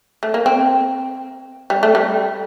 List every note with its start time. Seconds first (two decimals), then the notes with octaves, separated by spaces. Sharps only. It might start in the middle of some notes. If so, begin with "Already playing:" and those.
0.23 A3
0.34 A#3
0.46 C4
1.70 G3
1.83 A3
1.95 G3